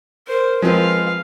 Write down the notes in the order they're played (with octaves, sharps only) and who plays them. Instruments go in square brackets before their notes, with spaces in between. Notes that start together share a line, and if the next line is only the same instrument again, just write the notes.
[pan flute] A#4 [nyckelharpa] C5
[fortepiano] F3 C4 F4 [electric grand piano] G#3 [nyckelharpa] B4 F5